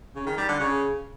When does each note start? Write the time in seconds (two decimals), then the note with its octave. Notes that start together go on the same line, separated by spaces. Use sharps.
0.15 C#3
0.27 D#3
0.38 G3
0.49 D3
0.60 C#3